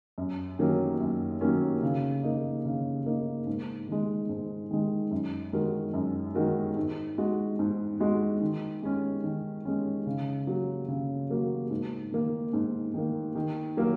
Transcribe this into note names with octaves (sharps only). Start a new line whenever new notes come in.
F#2
D#3 F#3 A#3 C#4
F#2
D#3 F#3 A#3 C#4
C#3
A#3 D#4
C#3
A#3 D#4
G#2
D#3 G#3
G#2
D#3 G#3
F#2
D#3 G#3 F#4 A#4
F#2
D#3 G#3 F#4 A#4
G#2
G#3 F#4
G#2
G#3 F#4
D#3
G#3 C#4
D#3
G#3 C#4
C#3
F#3 A#3 F#4
C#3
F#3 A#3 F#4
G#2
D#3 A#3
G#2
D#3 A#3
D#3
F#3 A#3 F#4 A#4